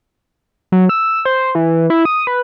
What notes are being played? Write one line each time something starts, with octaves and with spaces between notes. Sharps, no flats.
F#3
E6
C5
E3
E4
D#6
B4